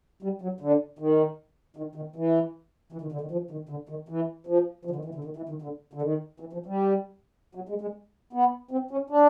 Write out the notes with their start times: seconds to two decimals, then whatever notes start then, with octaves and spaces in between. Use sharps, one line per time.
0.23 G3
0.42 F#3
0.60 D3
0.99 D#3
1.77 D#3
1.95 D#3
2.16 E3
2.92 E3
3.02 D#3
3.12 D3
3.21 D#3
3.31 F3
3.51 D#3
3.69 D3
3.89 D#3
4.09 E3
4.47 F3
4.85 F3
4.91 D3
4.96 D#3
5.05 E3
5.15 D3
5.24 D#3
5.37 E3
5.49 D#3
5.62 D3
5.93 D3
6.02 D#3
6.40 E3
6.53 F3
6.66 G3
7.55 F#3
7.69 G#3
7.81 G#3
8.33 B3
8.71 C4
8.91 C#4
9.10 D4